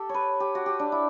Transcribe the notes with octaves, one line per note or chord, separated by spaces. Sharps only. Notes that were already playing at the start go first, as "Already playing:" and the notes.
Already playing: G4 A4
B4 C#5
G4
F#4
G4
D4
E4